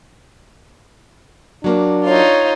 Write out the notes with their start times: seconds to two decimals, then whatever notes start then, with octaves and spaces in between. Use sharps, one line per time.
1.64 F#3 A#3 D4
2.06 D#4 F4 C#5